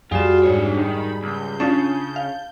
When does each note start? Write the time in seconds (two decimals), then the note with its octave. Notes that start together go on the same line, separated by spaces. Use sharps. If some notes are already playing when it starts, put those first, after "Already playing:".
0.12 F2 G3 F4 F#4 G#4 E7
0.44 G#2 D4 C#5
0.77 D#3 B5
1.23 C#2 G6
1.60 C#3 C#4 D4 F4 A5
2.16 F5